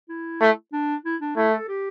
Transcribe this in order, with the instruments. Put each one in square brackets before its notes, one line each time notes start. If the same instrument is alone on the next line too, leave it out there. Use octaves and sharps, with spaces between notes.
[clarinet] E4
[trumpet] A3
[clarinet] D4
E4
D4
[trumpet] A3 [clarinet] E4
[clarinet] A4
G4